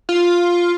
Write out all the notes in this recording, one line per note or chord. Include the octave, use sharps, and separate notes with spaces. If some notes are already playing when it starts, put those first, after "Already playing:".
F4